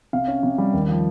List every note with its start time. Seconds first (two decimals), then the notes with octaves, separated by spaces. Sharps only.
0.13 C3 F5
0.28 C#4
0.43 C3
0.58 G3
0.74 D#2
0.88 F3